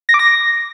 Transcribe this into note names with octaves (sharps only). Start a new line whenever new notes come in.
A#6
D6
A#6